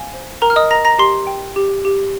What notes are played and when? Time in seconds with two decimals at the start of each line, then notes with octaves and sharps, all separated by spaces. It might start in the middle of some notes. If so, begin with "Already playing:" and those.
Already playing: F5 G#5
0.13 C5
0.41 A#4 G5 A#5
0.50 F6
0.56 D#5 D#6
0.71 A#4 A#5 A#6
0.85 A#5 A#6
0.99 G4 C6 C7
1.27 G5
1.56 G4
1.85 G4